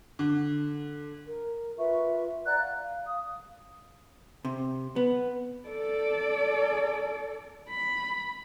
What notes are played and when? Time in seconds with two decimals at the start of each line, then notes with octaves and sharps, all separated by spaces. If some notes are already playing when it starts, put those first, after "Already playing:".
0.19 D3
1.27 A#4
1.78 F4 B4 E5 C#6
2.46 D5 F#5 A#5 F#6
2.59 F5
2.81 F5
3.07 F5 D#6
4.45 C3
4.96 B3
5.69 A4 D5
7.69 B5